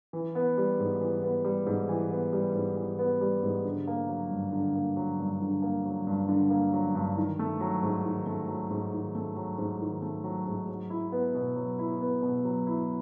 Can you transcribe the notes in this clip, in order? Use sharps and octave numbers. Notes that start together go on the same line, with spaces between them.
E3
B3
G3
G#2
E3
B3
G3
G#2
E3
B3
G3
G#2
E3
B3
G3
G#2
D3
A#3
F#3
G2
D3
A#3
F#3
G2
D3
A#3
F#3
G2
D3
A#3
F#3
G2
D#3
A3
F#3
G#2
D#3
A3
F#3
G#2
D#3
A3
F#3
G#2
D#3
A3
F#3
G#2
F#3
E4
B3
B2
F#3
E4
B3
B2
F#3
E4